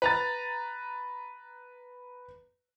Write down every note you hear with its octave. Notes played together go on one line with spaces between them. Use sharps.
B4 A#5 A6